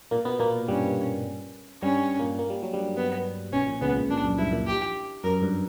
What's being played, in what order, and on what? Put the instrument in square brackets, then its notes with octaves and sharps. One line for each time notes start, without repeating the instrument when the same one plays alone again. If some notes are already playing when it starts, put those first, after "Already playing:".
[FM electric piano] A#2 A#3
B2 B3
A#2 A#3
[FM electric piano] G2 G3 [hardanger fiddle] C#4
[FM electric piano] G2 G3 [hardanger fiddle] C#4
[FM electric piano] A#2 A#3
A#3
G3
F#3
G2 G3
[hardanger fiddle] B3
[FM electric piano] B1 B2 [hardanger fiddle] C#4
[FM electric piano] A#1 A#2
[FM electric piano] C#2 C#3 [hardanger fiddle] B3
[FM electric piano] A#1 A#2
[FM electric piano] A#1 A#2 [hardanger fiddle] D4
[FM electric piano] F#2
[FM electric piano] G2 [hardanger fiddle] E4
[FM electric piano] A#1 A#2
[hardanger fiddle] G4
[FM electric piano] F#2 [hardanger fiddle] A#4
[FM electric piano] G2